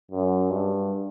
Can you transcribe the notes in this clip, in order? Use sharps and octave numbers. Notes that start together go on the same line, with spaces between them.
F#2
G2